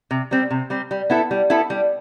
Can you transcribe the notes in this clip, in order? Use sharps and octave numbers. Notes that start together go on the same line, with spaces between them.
C3
G3 C4
C3
G3 C4
G3
B3 E4 A4
G3
B3 E4 A4
G3